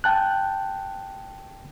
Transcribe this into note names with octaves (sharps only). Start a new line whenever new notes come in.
G5 A5 F#6